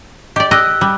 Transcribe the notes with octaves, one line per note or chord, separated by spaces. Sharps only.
G4 D5 D#5
G4 D#5 E6 F#6
G3